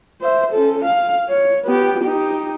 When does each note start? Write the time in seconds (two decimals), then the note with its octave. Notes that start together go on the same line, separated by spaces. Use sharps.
0.21 C5 E5
0.52 C#4 A4
0.84 F5
1.29 C#5
1.64 B3 G4
2.03 D#4 G4